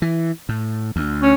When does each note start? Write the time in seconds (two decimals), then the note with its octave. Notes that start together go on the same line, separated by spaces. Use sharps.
0.02 E3
0.49 A2
0.96 D2
1.22 C#4